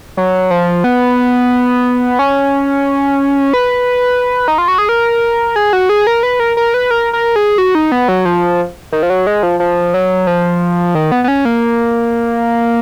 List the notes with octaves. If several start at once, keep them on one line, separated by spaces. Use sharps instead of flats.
F#3
F3
B3
C#4
B4
D#4
F4
F#4
G#4
A#4
G#4
F#4
G#4
A#4
B4
A#4
A#4
B4
A#4
A#4
G#4
F#4
D#4
B3
F#3
F3
D#3
F3
F#3
G#3
F3
F3
F#3
F3
D#3
B3
B3
C#4
A#3